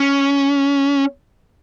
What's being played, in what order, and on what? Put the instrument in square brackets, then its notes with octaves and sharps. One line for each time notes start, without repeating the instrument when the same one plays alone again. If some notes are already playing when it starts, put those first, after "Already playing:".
Already playing: [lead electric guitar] C#4